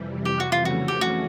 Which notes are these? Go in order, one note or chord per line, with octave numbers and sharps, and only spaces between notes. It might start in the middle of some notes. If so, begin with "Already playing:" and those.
Already playing: F2 C3 E3 G3
G4
F#4
F4
F2 C#3 E3 A3 C#4 F#4
G4
F#4